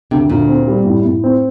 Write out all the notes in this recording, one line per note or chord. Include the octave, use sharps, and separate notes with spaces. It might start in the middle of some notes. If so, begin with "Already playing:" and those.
D2 C3
D2 A#2
C4
G3
A2
A2
C4